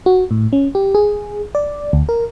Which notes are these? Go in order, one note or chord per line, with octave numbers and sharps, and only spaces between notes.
F#4
A2
C#4
G4
G#4
D5
D2
A#4